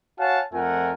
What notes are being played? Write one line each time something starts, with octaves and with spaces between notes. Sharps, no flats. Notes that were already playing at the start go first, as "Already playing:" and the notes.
F#4 C#5 F5 F#5 G#5 A5
F2 F3 A3 A#4 F#5 G#5